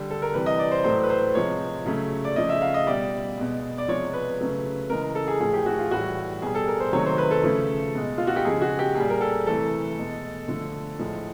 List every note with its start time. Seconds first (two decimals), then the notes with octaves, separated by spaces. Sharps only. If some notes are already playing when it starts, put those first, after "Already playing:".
Already playing: D3 G3
0.10 A4
0.22 A#4
0.34 C3 E3 G3 B4
0.46 D#5
0.59 D5
0.72 C5
0.84 A2 F#3 A3 C5
1.03 B4
1.10 C5
1.35 C3 F3 G#3 C#5
1.86 C#3 F#3 A3
2.25 D5
2.36 C#3 F3 A3 D#5
2.49 E5
2.62 F5
2.74 D#5
2.87 B2 G3 D5
3.38 B2 G#3
3.78 D5
3.88 C3 F3 G#3 C#5
4.13 B4
4.39 C#3 F#3 A3
4.90 C#3 E3 G#3 A#4
5.03 A#4
5.15 A4
5.28 G#4
5.40 A2 F3 A3 G#4
5.53 G4
5.66 F#4
5.79 F4
5.91 A2 E3 G3 F#4
6.42 B2 G3 G#4
6.55 A4
6.67 A#4
6.80 C5
6.93 C3 D#3 F#3 A3 C#5
7.06 C5
7.18 B4
7.31 A4
7.43 C#3 F3 A3
7.95 B2 G#3
8.18 F4
8.27 F#4
8.36 G4
8.45 C#3 F3 G#3 G#4
8.62 F#4
8.79 G4
8.95 A#2 G3 G#4
9.10 A#4
9.21 A4
9.47 C3 E3 A3 A4
9.98 B2 G#3
10.48 D3 F3 A3
10.99 A2 F3 G#3